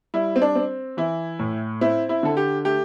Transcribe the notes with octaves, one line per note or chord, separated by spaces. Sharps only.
G3 E4
C4
D4
C4
E3 E4
A2
C4 E4
E4
D3 A4
G4
A3 G4